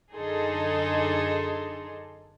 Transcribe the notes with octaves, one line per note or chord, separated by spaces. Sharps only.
F#2 D3 D#4 G#4 A4 C6